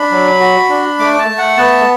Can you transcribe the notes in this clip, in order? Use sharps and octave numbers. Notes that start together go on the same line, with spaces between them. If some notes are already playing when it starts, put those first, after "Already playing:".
Already playing: D4 B5
F#3
F#4
D4
A3 D6
A5
A3
F#5
B3 A5